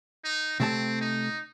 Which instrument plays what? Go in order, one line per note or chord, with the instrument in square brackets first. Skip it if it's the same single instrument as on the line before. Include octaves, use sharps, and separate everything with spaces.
[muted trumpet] D#4
[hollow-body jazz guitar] C3 A3 A5 [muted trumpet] C4
[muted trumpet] D#4